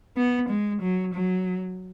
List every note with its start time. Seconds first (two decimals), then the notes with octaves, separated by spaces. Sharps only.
0.17 B3
0.49 G#3
0.82 F#3
1.14 F#3